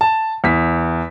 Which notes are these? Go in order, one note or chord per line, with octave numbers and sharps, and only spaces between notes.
A5
E2 B6